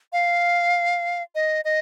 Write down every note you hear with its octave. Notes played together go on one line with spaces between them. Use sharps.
F5
D#5
D#5